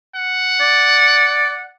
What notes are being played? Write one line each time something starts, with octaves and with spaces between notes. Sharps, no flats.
F#5
D5